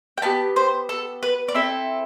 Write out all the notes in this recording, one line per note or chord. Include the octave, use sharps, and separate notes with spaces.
G5
B3 D4 G4 A5
C5
A4
B4
D5
C4 E4 A4 E5